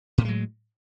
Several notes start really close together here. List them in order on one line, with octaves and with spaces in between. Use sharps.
A2 A#3 G#3 F#3